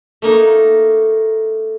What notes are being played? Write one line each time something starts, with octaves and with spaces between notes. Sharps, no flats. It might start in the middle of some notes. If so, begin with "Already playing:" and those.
A3 A#3 D#4